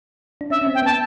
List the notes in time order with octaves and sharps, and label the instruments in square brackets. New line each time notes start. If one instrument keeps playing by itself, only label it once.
[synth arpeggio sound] D4
[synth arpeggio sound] C#4 [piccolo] E5
[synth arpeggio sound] C#4
C4
[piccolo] G5
[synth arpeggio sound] B3 [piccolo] A5